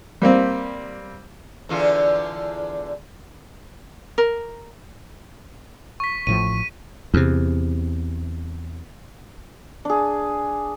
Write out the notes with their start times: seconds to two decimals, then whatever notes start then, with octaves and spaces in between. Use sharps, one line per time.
0.22 G3 A#3 C4
1.69 E2 D3 F4
4.18 A#4
6.00 C#6 B6
6.27 A1 A2 F3 D#7
7.14 E2 C3
9.85 D4 G#4